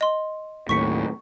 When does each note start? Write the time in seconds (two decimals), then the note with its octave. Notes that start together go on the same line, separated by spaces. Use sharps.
0.01 D#5 C6
0.69 D#2 A2 C#6 B6 C#7